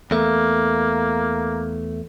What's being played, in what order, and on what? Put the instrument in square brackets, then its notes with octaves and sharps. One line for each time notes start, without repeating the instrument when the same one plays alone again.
[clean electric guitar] E2 A3 [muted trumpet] A#3